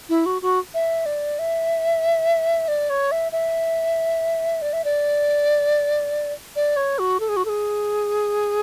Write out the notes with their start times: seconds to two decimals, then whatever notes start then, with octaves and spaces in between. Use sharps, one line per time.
0.09 E4
0.26 F#4
0.42 F#4
0.74 E5
1.06 D5
1.39 E5
2.68 D5
2.90 C#5
3.11 E5
3.32 E5
4.62 D5
4.73 E5
4.84 D5
6.56 D5
6.76 C#5
6.99 F#4
7.20 A4
7.29 G#4
7.37 F#4
7.45 A4
7.49 G#4